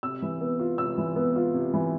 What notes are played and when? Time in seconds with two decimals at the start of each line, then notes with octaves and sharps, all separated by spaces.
0.03 C3 E6
0.22 E3
0.41 B3
0.59 F4
0.78 C3 E6
0.98 E3
1.16 B3
1.36 F4
1.54 C3
1.74 E3